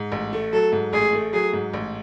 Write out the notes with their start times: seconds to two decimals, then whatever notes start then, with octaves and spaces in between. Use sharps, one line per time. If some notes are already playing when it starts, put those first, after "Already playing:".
Already playing: G#2
0.12 A1
0.33 A3
0.53 F#3 A4
0.72 G#2
0.93 A1 G#4
1.13 A3
1.33 F#3 G#4
1.53 G#2
1.74 A1